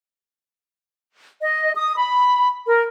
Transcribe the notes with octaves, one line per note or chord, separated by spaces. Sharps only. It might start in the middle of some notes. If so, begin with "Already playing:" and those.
D#5
D#6
B5
A#4